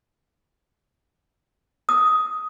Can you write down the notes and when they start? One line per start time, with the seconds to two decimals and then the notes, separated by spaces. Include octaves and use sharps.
1.89 D#6